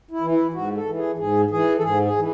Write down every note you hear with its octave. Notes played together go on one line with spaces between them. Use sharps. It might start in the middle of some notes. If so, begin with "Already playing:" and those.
E4
E3
E4
G#2 F#4
A4
E3
G#4
G#2 G#4
E3 G#4
A4
G#2 G#4
G#4
E3